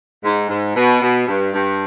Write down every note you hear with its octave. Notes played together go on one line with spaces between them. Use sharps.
G#2
G#2
B2
B2
G2
G2